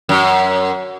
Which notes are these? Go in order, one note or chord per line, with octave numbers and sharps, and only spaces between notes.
F#2